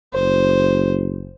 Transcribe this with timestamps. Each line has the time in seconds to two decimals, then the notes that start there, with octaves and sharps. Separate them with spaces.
0.14 F#1 C5